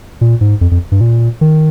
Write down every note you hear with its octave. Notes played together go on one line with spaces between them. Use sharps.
A#2
G#2
F2
F2
G2
A#2
D#3